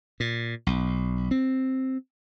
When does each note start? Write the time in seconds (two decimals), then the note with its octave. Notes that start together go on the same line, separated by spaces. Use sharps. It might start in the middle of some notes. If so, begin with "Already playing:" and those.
0.20 A#2
0.67 B1
1.31 C4